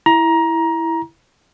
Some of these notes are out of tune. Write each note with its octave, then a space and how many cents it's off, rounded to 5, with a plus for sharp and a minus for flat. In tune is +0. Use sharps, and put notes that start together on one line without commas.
E4 +0 A#5 +20